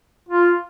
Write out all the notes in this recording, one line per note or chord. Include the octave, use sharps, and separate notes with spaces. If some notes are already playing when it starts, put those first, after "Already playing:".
F4